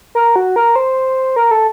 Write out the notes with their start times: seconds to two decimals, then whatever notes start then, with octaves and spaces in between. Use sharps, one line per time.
0.15 A#4
0.36 F#4
0.56 A#4
0.76 C5
1.36 A#4
1.51 A4